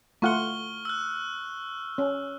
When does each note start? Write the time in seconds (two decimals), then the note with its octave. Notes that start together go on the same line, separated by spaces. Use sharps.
0.22 A3 F4 F#5 C#6 F6 G7
0.85 E6 F#6
1.98 C#4